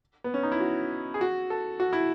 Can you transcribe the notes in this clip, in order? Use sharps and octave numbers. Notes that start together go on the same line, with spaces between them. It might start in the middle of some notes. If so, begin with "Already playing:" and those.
B3
C#4
D#4
E4
F#4
G#4
F#4
A4
F#4
E4